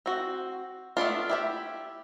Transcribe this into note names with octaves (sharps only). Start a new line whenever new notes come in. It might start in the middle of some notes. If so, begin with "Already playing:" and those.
C4 F#4
A3 B3 D4 F4
E4 G4 E5